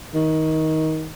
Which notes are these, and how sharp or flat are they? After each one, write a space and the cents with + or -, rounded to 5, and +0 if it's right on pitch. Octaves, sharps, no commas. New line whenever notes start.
D#3 +20